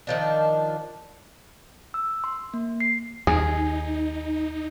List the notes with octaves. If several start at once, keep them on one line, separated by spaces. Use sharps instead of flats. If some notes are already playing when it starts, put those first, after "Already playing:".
D#3 F3 D4
E6
C6
A#3
C7
D#2 D#4 G#4